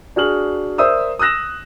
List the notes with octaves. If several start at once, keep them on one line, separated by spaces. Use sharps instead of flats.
D4 F#4 G#4 F6 F#7
A#4 C5 D5 E5 D#6 E6
D#6 E6 F#6 A#6 E7